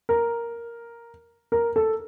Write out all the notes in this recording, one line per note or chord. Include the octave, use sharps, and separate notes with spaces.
A#4
A#4
A4